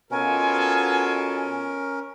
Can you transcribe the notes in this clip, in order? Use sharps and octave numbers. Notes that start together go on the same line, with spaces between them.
B2 C#4 F4 A4 A#4 G#5